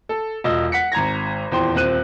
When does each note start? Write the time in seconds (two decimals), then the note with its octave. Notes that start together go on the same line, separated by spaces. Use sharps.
0.09 A4
0.44 E1 F4 D#5 E6
0.72 F#5 B6 C#7
0.92 G#1 A#5 G#6 A#6
1.51 D#1 E2 C5 G5 C6
1.74 D#1 C4 C5 F#6 D#7